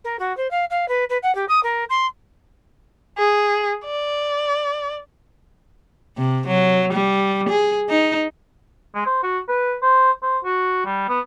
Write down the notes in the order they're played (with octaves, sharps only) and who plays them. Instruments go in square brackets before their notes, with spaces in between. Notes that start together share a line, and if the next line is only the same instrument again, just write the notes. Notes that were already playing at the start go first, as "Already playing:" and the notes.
[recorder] A#4
F#4
C5
F5
F5
B4
B4
F#5
G4
D#6
A#4
C6
[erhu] G#4
D5
[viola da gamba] C3
F#3
G3
G#4
D#4
[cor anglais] G#3
C5
F#4
B4
C5
C5
F#4
G3
B3